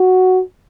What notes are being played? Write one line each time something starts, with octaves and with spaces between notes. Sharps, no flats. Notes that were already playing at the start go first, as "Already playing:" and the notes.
Already playing: F#4